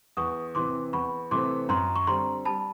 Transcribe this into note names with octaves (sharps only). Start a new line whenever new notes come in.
E2 C#6 D#6
C3 E3 C6 D6
E2 B5 C#6
C3 E3 A3 C4 C6 D6
F#2 A#5 C6
C#6
D3 G3 C4 A#5 C6
G3 A5 B5